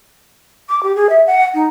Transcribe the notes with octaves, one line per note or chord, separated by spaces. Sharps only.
D6
G4
G#4
E5
F#5
D#4